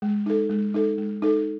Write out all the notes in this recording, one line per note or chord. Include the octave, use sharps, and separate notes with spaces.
G#3
D#4 A4
G#3
D#4 A4
G#3
D#4 A4